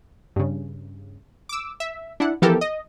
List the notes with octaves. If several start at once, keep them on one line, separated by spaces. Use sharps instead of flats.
G2 C#3
D6 E6
E5
D4 E4 F#5
E3 F3 B3 G4 A4 A#4
D#5